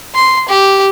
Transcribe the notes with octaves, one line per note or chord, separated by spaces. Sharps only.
C6
G4